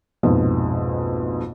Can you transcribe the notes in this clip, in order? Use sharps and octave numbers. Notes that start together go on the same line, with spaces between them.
A#1 F2 G#2 B2